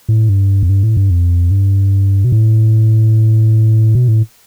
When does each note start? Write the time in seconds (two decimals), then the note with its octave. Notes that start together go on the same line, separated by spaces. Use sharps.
0.09 A2
0.29 G2
0.63 F2
0.69 G2
0.83 A2
0.97 G2
1.10 F2
1.51 G2
2.24 B2
2.32 A2
3.95 B2
4.08 A2